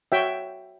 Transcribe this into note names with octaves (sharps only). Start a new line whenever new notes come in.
F#4 C#5 E5 G5